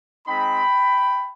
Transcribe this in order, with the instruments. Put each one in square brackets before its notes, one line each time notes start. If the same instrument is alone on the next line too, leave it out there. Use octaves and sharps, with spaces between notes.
[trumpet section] G#3 C4 D#4 G5 B5